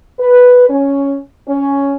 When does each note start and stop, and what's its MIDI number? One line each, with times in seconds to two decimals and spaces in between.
0.19 0.65 71
0.69 1.17 61
1.47 1.97 61